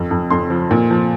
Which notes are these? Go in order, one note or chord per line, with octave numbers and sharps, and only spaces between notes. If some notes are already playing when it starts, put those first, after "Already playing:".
Already playing: F2
F2
F2 C6
F3
A#2
F3